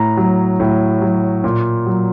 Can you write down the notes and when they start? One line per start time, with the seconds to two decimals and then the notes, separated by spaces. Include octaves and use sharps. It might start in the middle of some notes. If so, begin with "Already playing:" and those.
Already playing: A2 A#5
0.17 F#3
0.60 A2
1.01 F#3
1.44 A#2
1.86 F#3